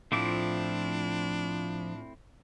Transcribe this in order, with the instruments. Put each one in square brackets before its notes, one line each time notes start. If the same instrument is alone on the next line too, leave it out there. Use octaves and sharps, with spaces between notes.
[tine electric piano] A2 F4 [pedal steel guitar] F3 D6 [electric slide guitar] A3 C4 E4 [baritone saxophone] D4